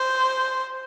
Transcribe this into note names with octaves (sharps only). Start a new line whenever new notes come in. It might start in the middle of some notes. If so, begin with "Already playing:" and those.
Already playing: C5